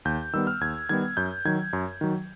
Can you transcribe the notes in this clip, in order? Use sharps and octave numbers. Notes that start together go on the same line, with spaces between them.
D#2 G6
D#3 G3 B3 E6
F6
D#2 G#6
D#3 G3 B3 G#6
F#2 G6
D#3 F#3 G#6
F#2
D#3 F#3